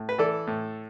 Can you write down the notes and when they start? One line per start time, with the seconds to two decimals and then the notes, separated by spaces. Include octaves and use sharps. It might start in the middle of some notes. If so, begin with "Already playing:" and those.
Already playing: A2
0.09 B4
0.18 E3 A4 D5
0.47 A2